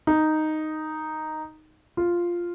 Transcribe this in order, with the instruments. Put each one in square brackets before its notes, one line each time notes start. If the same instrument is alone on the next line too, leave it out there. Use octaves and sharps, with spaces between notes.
[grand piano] D#4
F4